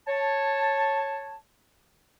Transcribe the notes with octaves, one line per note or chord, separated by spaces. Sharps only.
C#5 A5